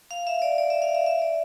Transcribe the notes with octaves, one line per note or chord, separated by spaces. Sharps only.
F5
E5
D5
D5
E5
F5
E5
E5
D5